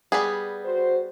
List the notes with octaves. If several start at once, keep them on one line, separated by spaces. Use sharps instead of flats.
G3 B3 G#4
F#4 C5